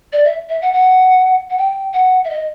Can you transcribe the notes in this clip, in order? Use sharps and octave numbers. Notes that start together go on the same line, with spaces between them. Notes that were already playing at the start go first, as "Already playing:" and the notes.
D5
E5
E5
F#5
F#5
F#5
G5
F#5
E5
D#5